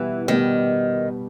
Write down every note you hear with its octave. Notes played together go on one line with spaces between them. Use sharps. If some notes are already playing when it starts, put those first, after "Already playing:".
Already playing: B2 E3 G3 B3 G4
B2 D#3 G3 B3 G4